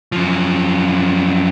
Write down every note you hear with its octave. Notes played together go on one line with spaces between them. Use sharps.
F#2 F3